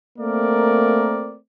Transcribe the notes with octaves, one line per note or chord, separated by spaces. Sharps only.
A3 A#3 C4 A#4 D5